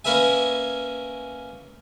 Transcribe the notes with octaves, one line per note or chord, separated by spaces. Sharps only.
A#3 C#4 A#4 B4 E5 G#5